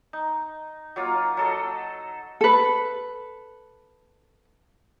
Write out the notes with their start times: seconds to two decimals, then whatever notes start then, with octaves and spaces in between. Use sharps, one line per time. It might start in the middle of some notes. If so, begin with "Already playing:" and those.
0.13 D#4
0.96 F#3 A#3 F4
1.37 F#3 A4 D#5
2.41 A4 B4